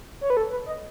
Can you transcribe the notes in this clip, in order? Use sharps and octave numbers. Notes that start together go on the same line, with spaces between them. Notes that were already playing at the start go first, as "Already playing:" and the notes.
C#5
B4
A4
B4
D#5